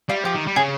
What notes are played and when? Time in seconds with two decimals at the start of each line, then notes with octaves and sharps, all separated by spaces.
0.09 G3 F4
0.24 F3 G4
0.35 D#3
0.46 G3
0.56 C#3 G#4